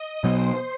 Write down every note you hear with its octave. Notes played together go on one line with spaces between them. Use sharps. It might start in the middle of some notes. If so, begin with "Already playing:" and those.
Already playing: D#5 D#6
B2 F#3 B3 C5 C6